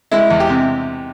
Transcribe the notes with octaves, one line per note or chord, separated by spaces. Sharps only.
G#3 E4
E2
G4
C3